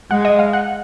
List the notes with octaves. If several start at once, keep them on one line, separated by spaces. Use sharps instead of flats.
G#3 F#5
D#5
F5
F#5